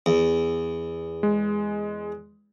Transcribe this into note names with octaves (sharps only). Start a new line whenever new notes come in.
E2
G#3